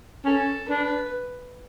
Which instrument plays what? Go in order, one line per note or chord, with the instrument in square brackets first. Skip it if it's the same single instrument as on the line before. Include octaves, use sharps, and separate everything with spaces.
[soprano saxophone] C#4 [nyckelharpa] A4
[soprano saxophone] D4 [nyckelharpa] B4